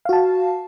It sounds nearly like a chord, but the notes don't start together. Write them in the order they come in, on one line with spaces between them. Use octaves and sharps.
F5 F#4 A5